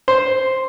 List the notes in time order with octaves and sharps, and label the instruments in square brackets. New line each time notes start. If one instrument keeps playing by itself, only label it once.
[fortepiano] C5